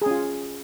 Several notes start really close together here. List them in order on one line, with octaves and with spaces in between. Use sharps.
G#4 C#4 F4